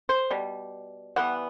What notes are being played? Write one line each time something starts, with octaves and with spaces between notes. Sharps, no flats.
C5
B2 G3
E3 G3 B3 F#5